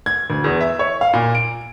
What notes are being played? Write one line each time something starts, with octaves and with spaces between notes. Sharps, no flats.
G#6
D2
E2
E5
C#5
F5
A#2
D7